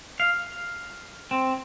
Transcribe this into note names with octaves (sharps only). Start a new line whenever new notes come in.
F5
C4